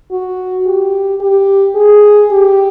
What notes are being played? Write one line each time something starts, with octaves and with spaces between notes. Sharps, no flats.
F#4
G4
G4
G#4
G4